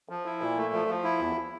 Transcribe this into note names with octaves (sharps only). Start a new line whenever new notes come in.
F3
E4
A#2
A3
F3
F3
E4
E2